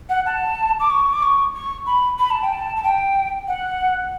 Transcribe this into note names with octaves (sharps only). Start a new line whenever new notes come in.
F#5
A5
D6
C#6
D6
C#6
C#6
B5
B5
A5
G5
A5
A5
G5
F#5